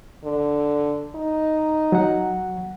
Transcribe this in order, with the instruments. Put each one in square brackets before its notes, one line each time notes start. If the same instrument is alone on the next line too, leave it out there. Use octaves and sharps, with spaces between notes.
[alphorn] D3
D#4
[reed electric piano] F#3 F#5